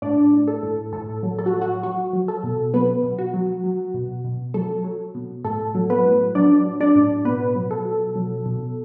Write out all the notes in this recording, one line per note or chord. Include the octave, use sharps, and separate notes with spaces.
A2 D4 D5
A2
A4
A2
A2 A4
F#3
A4
F#4
F#3
F#4
F#3 F#4
F#3
A4
B2
F#3 B3 B4
B2
F#4
F#3
F#3
B2
B2
F#3 A4
F#3
B2
A2 A4
F#3
B3 B4
A2
F#3 D4 D5
F#3
D4 D5
A2
B2 B3 B4
F#3
A4
B2
F#3
B2